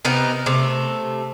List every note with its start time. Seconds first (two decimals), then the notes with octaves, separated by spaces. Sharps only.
0.05 C3 B3 D#4 A#4
0.46 C3 A3